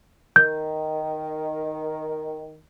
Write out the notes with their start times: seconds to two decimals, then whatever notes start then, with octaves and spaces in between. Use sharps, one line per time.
0.36 D#3 G6